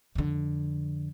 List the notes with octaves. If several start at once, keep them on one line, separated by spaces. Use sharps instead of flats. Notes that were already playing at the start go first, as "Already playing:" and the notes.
F2 D3